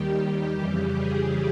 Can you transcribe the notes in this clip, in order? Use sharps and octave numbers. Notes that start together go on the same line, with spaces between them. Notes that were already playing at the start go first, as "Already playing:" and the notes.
Already playing: D#2 D#3 G3 G4
F2 C#3 E3 G3
G#4